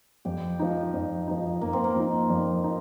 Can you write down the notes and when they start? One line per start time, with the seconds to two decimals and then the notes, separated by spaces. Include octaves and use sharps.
0.25 F2 G4
0.60 F3 D#4
0.94 F2
1.28 F3 D#4
1.61 F2 A#3
1.73 C4
1.84 A#3
1.96 F3 D#4
2.30 F2
2.64 D#4